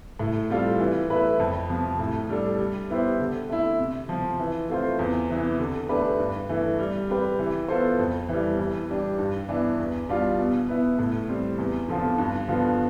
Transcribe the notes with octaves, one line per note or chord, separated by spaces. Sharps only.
A2
G3 C4 F4 A4
E3
A3 E4 B4
F2
C3 F3
A2
G3 D4 A4
G3
B3 E4 G4 C5
D3
A3 C4 E4
C3
F3 C4
E3
A3 C4 F4 C5
E2
C3 E3 B3
D3
A3 D4 G4 B4
G2
E3 A3
G3
C4 G4 B4
E3
B3 F4 A4 C5
F2
E3 G3
E3
G3 D4 G4
G2
E3 B3 D4
E2
B2 G3 D4 F4
B2
B3 E4
A2
G3 C4
E2
D3 F3 C4 F4
G2
D3 F3 B3 F4